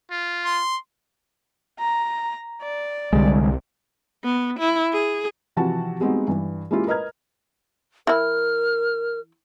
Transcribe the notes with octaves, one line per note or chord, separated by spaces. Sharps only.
F4
C6
A#5
D5
C2 D3 G3 G#3
B3
E4
G#4
C3 E3 F3 F#4 A5
G3 G#3 B3 C4 D#4 F#4
G2 E3
G#3 A#3 C#4 E4 F4 G4
A#4 B4 D#5 A#5 F6 G#6
E3 E4 A#4 F6